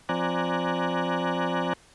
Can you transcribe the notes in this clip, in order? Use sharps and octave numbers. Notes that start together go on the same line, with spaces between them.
F3 C4 D5 G#5 A#5 F#6